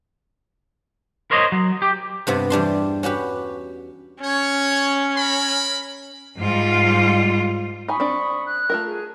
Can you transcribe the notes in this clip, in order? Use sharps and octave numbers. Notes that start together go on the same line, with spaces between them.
A#4 C5 C#5 D#5
F#3
G4
G2 C3 B3
E2 G3 D4 C6
C#4 F#4 G4 B4
C#4 C#5
A#4 B5
G#2 G3 F4
D#4 G#5 B5 C#6 D#6
C4 D4
F#6
A3 F4 A#4
G#4